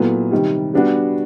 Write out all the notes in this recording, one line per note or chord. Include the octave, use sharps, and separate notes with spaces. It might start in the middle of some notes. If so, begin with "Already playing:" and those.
Already playing: A#2 F#3 B3 E4 A4
C3 D#3 G3
G3 B3 D4 F#4